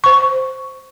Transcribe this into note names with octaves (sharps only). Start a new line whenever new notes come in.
C5 C#6